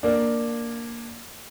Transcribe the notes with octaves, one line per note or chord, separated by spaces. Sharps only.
A#3 D4